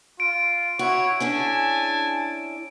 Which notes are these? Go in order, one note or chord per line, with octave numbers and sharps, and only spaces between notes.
F4 D7
E4 F#4 C#5
C#4 D4 E4 G#4 G#5 A5